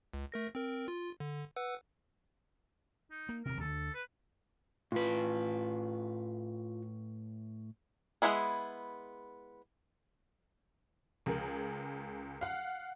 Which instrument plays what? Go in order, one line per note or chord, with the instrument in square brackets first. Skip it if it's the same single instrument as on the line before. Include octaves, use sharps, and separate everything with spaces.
[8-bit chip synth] C#2
A3 A#4 A#6
C4 A#4
F4
D3
B4 F#5 E6
[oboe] D#4
[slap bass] A#3
[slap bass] D#1 C3 [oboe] A#4
[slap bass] D2 D3 [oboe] A4
[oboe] B4
[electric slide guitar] A2 B4 [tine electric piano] F4
[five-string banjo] G#3 A3 B3 E4 G#4
[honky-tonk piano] C#2 G#4 A#4
F5 F#5